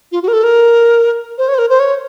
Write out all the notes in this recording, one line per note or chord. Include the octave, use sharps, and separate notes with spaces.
F4
F#4
A#4
A4
A#4
C5
C#5
C5
A#4
C5
C#5